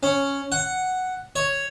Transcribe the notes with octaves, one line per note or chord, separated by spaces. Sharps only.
C#4
F#5
C#5